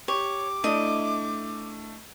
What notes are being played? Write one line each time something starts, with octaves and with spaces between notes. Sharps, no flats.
G4 C#5 D6
A3 D4 E4 D5 D#5